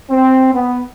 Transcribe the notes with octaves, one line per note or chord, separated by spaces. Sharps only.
C4
B3